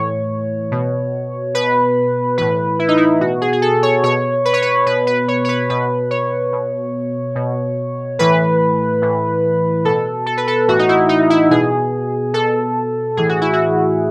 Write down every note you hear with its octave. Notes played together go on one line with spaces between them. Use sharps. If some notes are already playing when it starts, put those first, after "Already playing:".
Already playing: A2 E3 C#5
B2
B2 B4
A2 E3 B4
E4
D#4
E4
B2 F#4
G#4
G#4
A4
C#5
B2 C#5
B4
C#5
B4
B2 B4
B4
C#5
C#5
B4
B2 B4
C#5
B2
B2
A2 E3 B4
A2 E3
B2 A4
A4
B4
A4
A2 E3 F#4
D#4
E4
D#4
E4
B2 G#4
B2 A4
A2 E3 G#4
F#4
E4
F#4